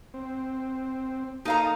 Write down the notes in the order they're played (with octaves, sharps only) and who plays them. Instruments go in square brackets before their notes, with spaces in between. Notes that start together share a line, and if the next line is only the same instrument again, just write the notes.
[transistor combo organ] C4
[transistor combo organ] A#3 A4 D#6 [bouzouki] D#4 F5 A#5